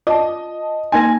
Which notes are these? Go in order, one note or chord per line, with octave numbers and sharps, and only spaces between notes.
F4 D5 D#5 A5
A#3 D#4 G#5 A5 C6 G#6 A#6